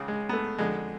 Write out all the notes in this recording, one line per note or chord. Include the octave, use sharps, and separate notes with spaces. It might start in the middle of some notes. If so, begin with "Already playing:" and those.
Already playing: C#2 C#3
G#3
B3
A3
F2 D3 G#3